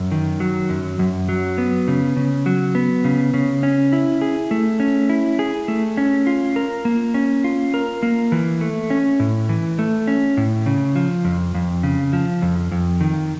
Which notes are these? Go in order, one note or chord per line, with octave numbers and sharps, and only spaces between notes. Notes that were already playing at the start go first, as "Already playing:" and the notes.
Already playing: F#2
D#3
F#3
F#2
F#2
F#3
B3
C#3
C#3
F#3
B3
C#3
C#3
C#4
E4
G#4
A3
C#4
E4
G#4
A3
C#4
F4
A#4
A#3
C#4
F4
A#4
A#3
E3
A3
C#4
A2
E3
A3
C#4
A2
C#3
F3
F2
F2
C#3
F3
F2
F2
D#3